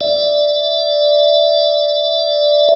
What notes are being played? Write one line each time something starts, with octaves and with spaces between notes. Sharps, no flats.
D5 E5